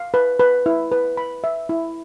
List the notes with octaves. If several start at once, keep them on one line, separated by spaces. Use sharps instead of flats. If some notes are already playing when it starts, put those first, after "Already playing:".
Already playing: F5
B4
B4
E4
B4
B5
E5
E4